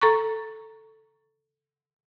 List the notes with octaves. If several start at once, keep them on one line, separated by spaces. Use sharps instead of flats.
A4 A#5 C#6